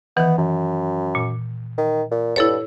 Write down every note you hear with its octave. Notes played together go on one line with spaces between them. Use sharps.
D#3 E3 B3
F#2
A#2
D#3
A#2
G2 E4 A4 C#5